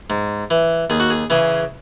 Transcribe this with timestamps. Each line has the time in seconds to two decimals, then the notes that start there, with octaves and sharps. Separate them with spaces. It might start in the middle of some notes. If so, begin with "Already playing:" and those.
0.10 G#2
0.50 E3
0.90 D#2 G#4
1.00 F#4
1.10 G#4
1.30 C#3 E3 G#4